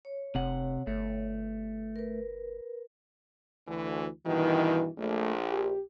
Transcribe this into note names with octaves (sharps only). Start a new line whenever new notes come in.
C#5
F1 C3 F#5
G1 A3
A#4 B4
D2 E3
G2 B2 D#3 E3
A#1 A3
G4